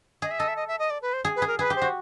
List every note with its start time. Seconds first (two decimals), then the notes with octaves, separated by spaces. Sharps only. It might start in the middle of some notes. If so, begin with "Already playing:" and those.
0.22 G#4 D#5
0.31 E5
0.39 A4 D#5
0.48 E5
0.56 D#5
0.68 E5
0.79 D#5
0.90 D5
1.02 B4
1.13 C5
1.25 G#4
1.36 B4
1.42 G#4
1.47 A#4
1.59 G#4 B4
1.70 G4
1.76 C5
1.82 F#4